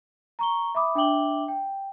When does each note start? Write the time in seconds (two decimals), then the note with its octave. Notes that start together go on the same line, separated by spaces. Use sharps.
0.39 A#5 C#6 G7
0.75 E5 B5 D6 D#6
0.95 D4 E5 G5 D6 F#7 G7
1.48 G5